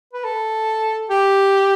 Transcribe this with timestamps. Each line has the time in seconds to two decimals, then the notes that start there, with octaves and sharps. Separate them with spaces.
0.13 B4
0.24 A4
1.09 G4